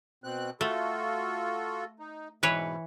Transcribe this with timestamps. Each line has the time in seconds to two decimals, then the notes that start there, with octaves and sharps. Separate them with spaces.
0.24 B2 C4 F#6
0.61 A3 F4 F#4 A4
2.00 D#4
2.43 G#2 B2 E3 B4 C#5